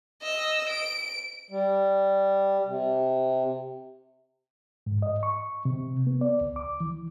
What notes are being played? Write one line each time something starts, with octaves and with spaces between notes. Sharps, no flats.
D#5 E6
D7
G3
C3
G#2
D#5
C#6
C3
B3
D5
C#2
D6
E3